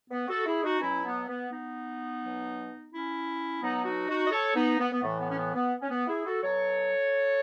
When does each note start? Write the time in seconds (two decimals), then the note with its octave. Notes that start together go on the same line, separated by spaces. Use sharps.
0.10 B3
0.27 F#4 A4
0.45 E4 G#4
0.63 D#4 F#4
0.80 B2 F#3 C#4 E4
1.04 B3
1.27 B3
1.50 B3 D#4
2.20 B2 F#3
2.91 C#4 E4
3.61 B2 F#3 B3 D#4
3.84 D#4 F#4
4.08 D#4 F#4
4.27 D#5
4.31 A4 C#5
4.54 B3 D#4
4.78 B3
4.91 B3
5.01 A2 E3 A3
5.19 B3
5.28 C#4
5.37 B3
5.54 B3
5.81 C#4
5.89 B3
6.07 E4 G#4
6.24 F#4 A4
6.42 B2 F#3 A4 C#5